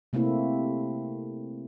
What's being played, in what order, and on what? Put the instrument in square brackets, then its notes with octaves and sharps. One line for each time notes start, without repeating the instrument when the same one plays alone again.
[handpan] C3 A3 A#3 C4 E4